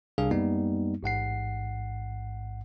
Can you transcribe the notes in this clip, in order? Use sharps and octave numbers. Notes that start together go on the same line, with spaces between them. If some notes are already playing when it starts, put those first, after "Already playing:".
C2 C3 G3 D4 G#4 F5
F#2 G3 A#3 B3 D#4
A1 G#2 F#5 C7